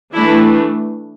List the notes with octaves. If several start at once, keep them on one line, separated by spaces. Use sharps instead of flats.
E3 A3 D4 E4